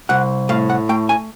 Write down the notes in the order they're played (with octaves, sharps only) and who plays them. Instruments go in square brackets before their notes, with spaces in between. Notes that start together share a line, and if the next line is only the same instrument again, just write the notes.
[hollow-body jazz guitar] C2 F#5
A2 F5
F#5
A3 G5
G#5